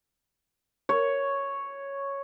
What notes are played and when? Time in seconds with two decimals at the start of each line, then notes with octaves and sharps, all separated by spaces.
0.89 C#5